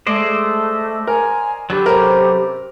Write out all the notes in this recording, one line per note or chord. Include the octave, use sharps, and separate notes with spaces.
G#3 A3 C5 D5 D#5
A#4 G#5
D3 F#3 G4 A4 B4
C3 C#4 A#4